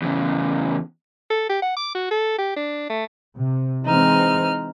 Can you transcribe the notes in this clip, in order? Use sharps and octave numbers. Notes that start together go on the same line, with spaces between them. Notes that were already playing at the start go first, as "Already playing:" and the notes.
E2 C#3
A4
G4
F#5
D6
F#4
A4
G4
D4
A3
C3
E3 G#3 C4 D#4 F6